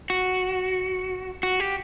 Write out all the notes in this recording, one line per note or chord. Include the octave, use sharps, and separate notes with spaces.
F#4
F#4
G4